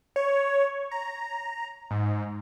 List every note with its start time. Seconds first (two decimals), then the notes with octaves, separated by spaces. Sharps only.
0.16 C#5
0.91 A#5
1.91 G#2